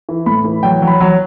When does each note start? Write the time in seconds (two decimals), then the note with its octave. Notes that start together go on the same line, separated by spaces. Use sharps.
0.09 E3
0.26 A2 B5
0.45 E3
0.63 F#3 G5
0.82 F#3
0.87 B5
1.00 F#3